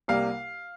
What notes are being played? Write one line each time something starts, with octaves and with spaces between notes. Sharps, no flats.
C2 C3 G3 A#3 F5